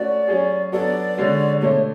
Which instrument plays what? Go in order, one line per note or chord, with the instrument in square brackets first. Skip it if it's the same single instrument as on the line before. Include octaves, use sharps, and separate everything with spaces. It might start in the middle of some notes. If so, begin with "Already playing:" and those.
Already playing: [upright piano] A3 C#4 F#4 [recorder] D5
[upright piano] F#3 C#4 G#4
[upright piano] F#3 B3 D4 A4 [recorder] D5
[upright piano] D3 G#3 C#4 F#4
[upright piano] B2 A3 D4 [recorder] C#5